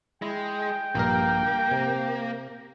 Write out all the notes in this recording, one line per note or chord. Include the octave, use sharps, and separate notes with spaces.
G#3 E4 G5
A#1 G2 A#3 A#4
C3